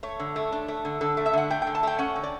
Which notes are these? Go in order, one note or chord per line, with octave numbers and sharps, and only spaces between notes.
A3 C#5
D3
A3
D4
A3
D3
D3 A4
A3
E5
D3 F#5
A3 G5
G5
D3
A5
A3 G5
C#4 F#5
D3
D5